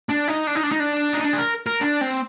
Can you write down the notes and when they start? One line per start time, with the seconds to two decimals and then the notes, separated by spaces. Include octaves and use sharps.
0.09 D4
0.28 D#4
0.47 D4
0.55 D#4
0.63 D4
0.72 D#4
0.80 D4
1.13 D#4
1.24 D4
1.33 G#4
1.38 A#4
1.67 A#4
1.81 D4
2.01 C4